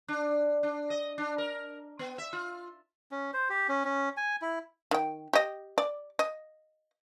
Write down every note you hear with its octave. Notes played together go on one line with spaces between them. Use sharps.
D4
D4
D#5
D4
A#4
B3
E5
F4
C#4
C5
G4
C#4
C#4
G#5
E4
D#3 G5
G4 D#5
D5
D#5